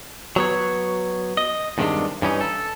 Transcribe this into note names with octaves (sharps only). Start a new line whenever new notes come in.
F#3 B3 C#5
D#5
E2 G2 C3 D#3 G#3 D4
G2 E3 C#4 D#4
A4